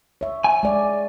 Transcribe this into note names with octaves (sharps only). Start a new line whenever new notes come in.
C#5 E5
G#5
G#3 D5